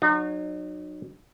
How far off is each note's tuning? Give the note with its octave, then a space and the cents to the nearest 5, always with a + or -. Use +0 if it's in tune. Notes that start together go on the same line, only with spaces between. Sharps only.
F#3 -15 D#4 -40